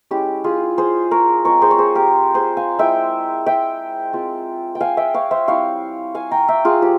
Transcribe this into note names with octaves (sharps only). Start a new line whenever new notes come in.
G#3 C#4 E4 G4
F4 G#4
G#4 C5
A#4 C#5
G#3 C4 F4 A#4 C#5
G#4 C5
C#5
G#4 C5
G4 A#4
G#4 C5
F5 G#5
G#3 E4 E5 G5
E5 G5
G#3 C4 F4
G5
F5 G#5
E5 G5
C#5 F5
C5 E5
G3 C4 E4 C#5 F5
F5 G#5
G5 A#5
E5 G5
F4 G#4
F3 G4